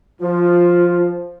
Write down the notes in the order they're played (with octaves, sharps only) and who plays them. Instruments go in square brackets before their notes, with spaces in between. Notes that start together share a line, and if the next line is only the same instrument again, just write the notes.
[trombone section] F3 [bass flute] F4